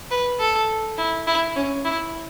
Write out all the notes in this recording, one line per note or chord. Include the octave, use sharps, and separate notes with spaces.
B4
A4
E4
E4
C#4
E4